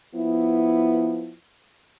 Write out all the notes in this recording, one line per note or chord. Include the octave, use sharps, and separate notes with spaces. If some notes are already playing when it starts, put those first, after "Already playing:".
F3 B3 E4